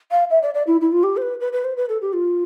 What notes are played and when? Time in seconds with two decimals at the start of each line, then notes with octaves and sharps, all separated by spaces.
0.11 F5
0.30 E5
0.42 D5
0.54 D5
0.66 E4
0.81 E4
0.92 F4
1.03 G4
1.16 C5
1.21 B4
1.40 B4
1.52 B4
1.64 C5
1.76 B4
1.89 A4
2.01 G4
2.13 F4